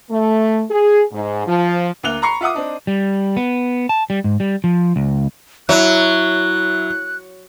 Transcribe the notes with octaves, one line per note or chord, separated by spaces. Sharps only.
A3
G#4
G#2
F3
D2 A#3 F#6 F7 G7
A#5 B5 C#6 C7 C#7
F4 E5 F#5 D6 D#6
C4 D4 D#4
G3
B3
A5
G3
G#2
G3
F3
C#2
F#3 E4 F#6